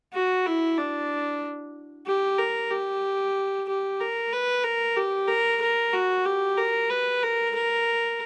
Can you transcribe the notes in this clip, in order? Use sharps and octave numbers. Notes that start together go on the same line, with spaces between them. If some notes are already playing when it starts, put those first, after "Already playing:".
F#4
E4
D4
G4
A#4
G4
G4
A#4
B4
A#4
G4
A#4
A#4
F#4
G4
A#4
B4
A#4
A#4